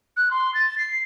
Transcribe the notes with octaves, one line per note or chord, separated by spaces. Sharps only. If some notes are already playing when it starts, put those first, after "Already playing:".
F#6
C6
A6
C7